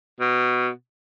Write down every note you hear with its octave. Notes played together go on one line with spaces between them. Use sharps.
B2